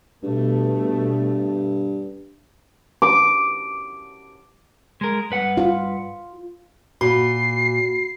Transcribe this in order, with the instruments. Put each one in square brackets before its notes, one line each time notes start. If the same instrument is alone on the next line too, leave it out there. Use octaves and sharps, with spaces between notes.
[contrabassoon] G2 [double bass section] B2 A3
[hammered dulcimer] D6
[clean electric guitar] G#3 A#4
G2 B4 F#5
[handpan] F4
[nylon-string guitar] A#2 [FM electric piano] F#4 [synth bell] B5 [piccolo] C7